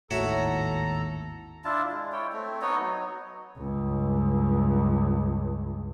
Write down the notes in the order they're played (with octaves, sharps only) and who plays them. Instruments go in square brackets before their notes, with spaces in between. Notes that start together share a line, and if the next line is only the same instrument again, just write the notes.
[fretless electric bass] G#1 D#2 A2 [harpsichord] F#4 C#5 E5 [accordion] A4 A#5
[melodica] D4 E4 F4 A5
G#3
E4 C#5 G5
A3 C4
B3 D#4 C#5 D#5
F#3
[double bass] C#2 G2